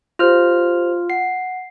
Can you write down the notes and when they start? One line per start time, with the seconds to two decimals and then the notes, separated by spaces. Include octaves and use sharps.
0.19 F4 G4 C5 F6 F7
1.10 F#5 C7